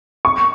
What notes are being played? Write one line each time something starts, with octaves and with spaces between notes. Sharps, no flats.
C#6